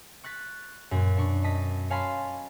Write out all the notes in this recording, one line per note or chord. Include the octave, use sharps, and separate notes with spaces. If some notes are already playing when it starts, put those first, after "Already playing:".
C#6 F#6 A6 B6
F#2 A#2
B2 D4 C#6
D#5 A5 B6
C#5 F5 G#5 A5 B5 C6